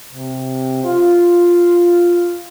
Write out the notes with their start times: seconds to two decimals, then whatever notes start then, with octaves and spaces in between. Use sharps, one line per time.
0.12 C3
0.84 F4